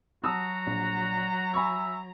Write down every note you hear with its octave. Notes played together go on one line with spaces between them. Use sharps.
F#3 F#4 A5 A#5 D#6 E6
A#1
E5 G#5 B5 C#6